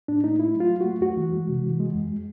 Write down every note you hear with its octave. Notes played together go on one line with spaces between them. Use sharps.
A2 D4
A3 D#4
A3 E4
F#3
F4
F#3
A3 F#4
F2 F#4
E3
G#3
C3
E3
G#3
F2